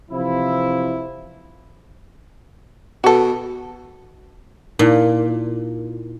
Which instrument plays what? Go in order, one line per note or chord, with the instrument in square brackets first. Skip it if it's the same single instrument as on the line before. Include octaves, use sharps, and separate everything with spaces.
[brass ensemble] C3 E3 F3 E4
[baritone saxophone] B2 [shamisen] F#4 A4
[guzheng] A#2 [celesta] D#4 E4